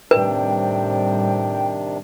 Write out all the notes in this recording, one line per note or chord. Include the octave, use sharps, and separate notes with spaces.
A2 C3 D#3 G3 C4 D4 B4 G5